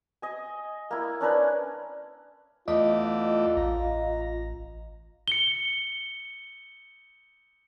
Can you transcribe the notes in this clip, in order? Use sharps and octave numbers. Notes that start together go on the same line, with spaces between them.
D#5 G#5
A#3 E4
C#4 D4 A#4 B4
E2 A3 F4 D5 D#5
A1 A#5
C#7 G7